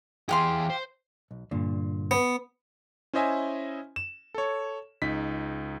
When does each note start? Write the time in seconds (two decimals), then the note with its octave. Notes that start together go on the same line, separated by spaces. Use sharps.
0.29 E3 G4 G#4 F5 C6
0.70 C5
1.31 B1
1.51 G2 A#2 D3
2.11 B3
3.13 C#4 E4 C5 D#5 E5 G#5
3.96 E7
4.34 A4 C#5
5.02 C#2 D#4 B6